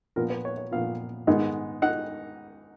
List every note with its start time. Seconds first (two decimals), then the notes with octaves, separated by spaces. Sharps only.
0.16 A#2 F3 B3 F4 A#4
0.30 B4
0.45 C#5
0.58 C#5
0.71 A#2 F3 B3 F4 F5
1.27 G#2 D#3 G#3 B3 D#4
1.82 D#4 F#5